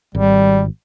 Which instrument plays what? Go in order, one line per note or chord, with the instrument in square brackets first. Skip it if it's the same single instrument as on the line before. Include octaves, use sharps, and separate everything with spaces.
[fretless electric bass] G#1 [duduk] G3